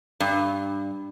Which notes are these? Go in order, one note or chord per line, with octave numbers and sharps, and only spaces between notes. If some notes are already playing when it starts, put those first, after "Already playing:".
G2